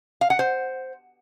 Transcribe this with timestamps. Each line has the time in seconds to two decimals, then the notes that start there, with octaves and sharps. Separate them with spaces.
0.21 F5
0.30 F#5
0.39 C5